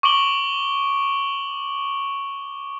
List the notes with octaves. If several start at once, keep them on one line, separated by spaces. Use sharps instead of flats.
C#6 D6 D7 F#7 G7